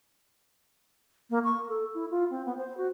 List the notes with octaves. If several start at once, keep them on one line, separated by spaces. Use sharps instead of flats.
A#3
C#6
A4
E4
F4
C4
B3
C5
F#4